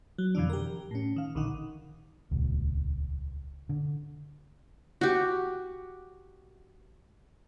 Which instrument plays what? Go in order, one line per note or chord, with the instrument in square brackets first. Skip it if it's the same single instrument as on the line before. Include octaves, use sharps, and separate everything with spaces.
[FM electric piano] F#3
F2 B2 D3 E3 D4
G4 A#4
A2 C#4
D#3 F5
A#1 D3 D#3 D#4 F#5
[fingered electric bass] D#1 C#2
D3
[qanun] F#4 G4